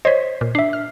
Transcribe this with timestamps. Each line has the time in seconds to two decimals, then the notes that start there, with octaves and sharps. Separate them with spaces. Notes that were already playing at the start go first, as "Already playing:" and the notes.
0.05 C5 C#5 D#5 B6
0.41 A#2
0.55 D4 E5 C7
0.73 F6